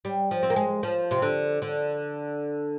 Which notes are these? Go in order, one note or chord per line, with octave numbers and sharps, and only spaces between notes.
G3
F3
C4
A#3
G#3
F3
C3
D3
D3